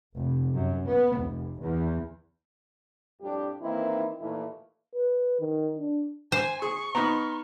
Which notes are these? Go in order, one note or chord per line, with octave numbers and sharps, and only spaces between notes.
F1
F#2
B3
F1
E2
F2 A2 G3 D4 G4
D#3 E3 A#3 C4 D#4 E4
D#2 A#2 E3 A3 D#4 E4
B4
D#3
D4
C5 G#5
G#4 C#6
B3 D#4 A#5 B5 F6